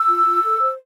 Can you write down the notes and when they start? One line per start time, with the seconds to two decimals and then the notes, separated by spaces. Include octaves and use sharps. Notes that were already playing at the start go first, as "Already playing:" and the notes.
Already playing: E6
0.09 F4
0.25 F4
0.43 A4
0.60 C5